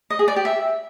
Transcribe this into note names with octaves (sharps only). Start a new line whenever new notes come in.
D#5
G#4
D5
G4
E5